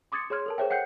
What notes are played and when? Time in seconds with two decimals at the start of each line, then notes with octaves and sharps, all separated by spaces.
0.12 C6 D6 D#6 G#6 A6 C#7
0.30 G#4 C#5 C6 F6 G#6
0.46 A4 A#4 A5
0.58 G#4 C5 C#5 E5 G5
0.70 F#5 G5 F#6 G6 C7 C#7